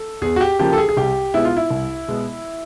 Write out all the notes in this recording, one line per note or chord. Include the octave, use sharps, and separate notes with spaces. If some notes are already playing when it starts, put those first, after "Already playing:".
Already playing: A4
E2 G#4
F#4
G4
C#3 F3 A#3 G4
A4
G#4
G#4
C2 G4
B2 G#3 B3 E4
F4
E4
C2
B2 G#3 B3